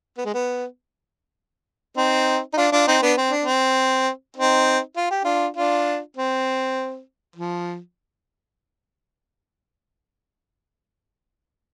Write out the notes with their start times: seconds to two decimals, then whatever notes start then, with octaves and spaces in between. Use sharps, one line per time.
0.18 B3
0.25 G#3
0.34 B3
1.97 C4 D#4
2.53 D#4
2.57 D4 F4
2.72 D4 F4
2.87 C4 D#4
3.02 B3 D4
3.17 C4
3.31 D4
3.45 C4
4.37 C4 D#4
4.97 F4
5.11 G4
5.24 D4 F4
5.57 D4 F4
6.17 C4
7.36 F3